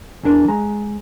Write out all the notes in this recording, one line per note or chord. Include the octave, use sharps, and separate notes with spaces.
E2 E3 D4 A#4
G#3 A#5